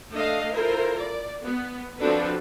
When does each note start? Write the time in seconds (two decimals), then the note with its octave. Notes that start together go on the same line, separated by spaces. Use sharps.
0.12 A3 D4 D#5 F5
0.53 E4 F4 A4 A#4 C5
0.98 D5
1.45 B3
1.99 F3 C4 D4 F#4 A4 B4